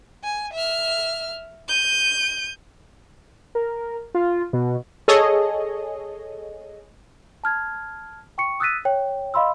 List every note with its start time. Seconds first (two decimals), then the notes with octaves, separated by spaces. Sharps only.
0.23 G#5
0.53 E5 F6
1.68 G6 D#7
3.55 A#4
4.15 F4
4.53 B2
5.08 G#4 A4 C#5 D#5
7.44 A5 F6 G#6
8.38 G5 C#6 C#7
8.60 D#6 E6 F#6 A6 B6 D#7
8.85 C#5 G5
9.34 D#5 F5 B5 C6 E6